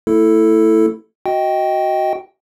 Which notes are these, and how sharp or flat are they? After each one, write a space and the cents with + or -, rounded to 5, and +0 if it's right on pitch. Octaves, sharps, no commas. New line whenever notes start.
A3 +25 E4 +0 A4 +0
F#4 +0 D#5 +15 G5 -5